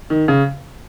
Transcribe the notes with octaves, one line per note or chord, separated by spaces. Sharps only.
D#3
C#3